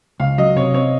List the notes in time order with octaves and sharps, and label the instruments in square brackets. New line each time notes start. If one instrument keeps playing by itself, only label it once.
[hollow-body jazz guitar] C#2 [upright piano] F5
[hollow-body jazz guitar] F#3 [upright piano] D#5
[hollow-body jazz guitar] C3 [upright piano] C#5
[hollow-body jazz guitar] C4 [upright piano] C#5